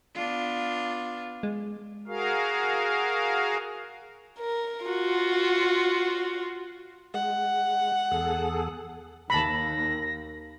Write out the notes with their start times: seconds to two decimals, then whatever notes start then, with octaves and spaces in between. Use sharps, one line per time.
0.15 B3 D4 F4
1.43 G#3
2.08 F#4 G#4 A#4 F5
4.39 A#4
4.85 F4 F#4
7.14 G#3 F#5
8.11 E2 G#4 A4
9.30 D#2 A5 B5 A#6